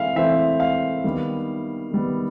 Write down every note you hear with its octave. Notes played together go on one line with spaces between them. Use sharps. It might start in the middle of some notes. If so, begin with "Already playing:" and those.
Already playing: E3 A3 C4 E5 F5
E3 A3 C4 E5
F5
D#3 G3 B3
D#3 G3 B3